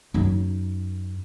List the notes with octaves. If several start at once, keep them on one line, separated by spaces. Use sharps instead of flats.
F#2 D#4